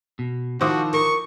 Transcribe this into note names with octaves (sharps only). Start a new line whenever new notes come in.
B2
D#3 F3 E4 F#4 C5 D6 D#6
A#4 C#6